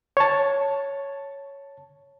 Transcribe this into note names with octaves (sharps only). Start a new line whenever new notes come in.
C#5 A5